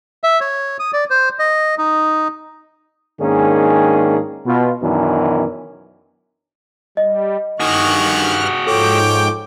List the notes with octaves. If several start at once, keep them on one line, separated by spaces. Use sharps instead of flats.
E5
C#5
D#6
D5
C5
D#5
D#4
G#2 D#3 A#3 C#4 D4 G#4
B2 F4
F#2 B2 D#3 E3 C#4 D4
G3 D#5
G2 D#3 F#4 G#4 C#6 F6 F#6
G#2 F3 A4 C#5 G5 D6